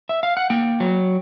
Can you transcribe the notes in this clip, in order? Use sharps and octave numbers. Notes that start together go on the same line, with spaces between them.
E5
F5
F#5
A#3 G5
F#3